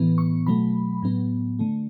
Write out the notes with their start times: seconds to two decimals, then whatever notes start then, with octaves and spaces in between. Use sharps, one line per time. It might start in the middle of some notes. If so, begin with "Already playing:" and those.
Already playing: A2 E3 B3
0.18 C#6
0.47 B2 F#3 A3 B5
1.03 A2 F#3 B3
1.59 D3 A3